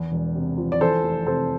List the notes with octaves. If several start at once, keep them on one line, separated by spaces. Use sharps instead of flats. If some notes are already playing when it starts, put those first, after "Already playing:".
Already playing: E2
E1
C3
F3
D5
E3 A4 C5
F1
C3 A4 C5